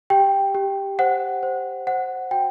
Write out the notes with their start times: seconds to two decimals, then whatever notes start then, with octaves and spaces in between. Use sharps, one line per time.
0.10 G4 G5
0.55 G4
0.99 C5 F#5
1.43 C5
1.87 C5 F#5
2.31 F#4 G5